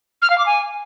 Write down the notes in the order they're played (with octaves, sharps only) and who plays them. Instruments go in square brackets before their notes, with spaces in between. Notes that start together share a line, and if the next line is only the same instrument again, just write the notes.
[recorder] F6
F5
D6
G#5